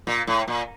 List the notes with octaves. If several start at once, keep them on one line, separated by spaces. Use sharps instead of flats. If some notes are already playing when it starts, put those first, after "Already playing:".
A#2
A2
A#2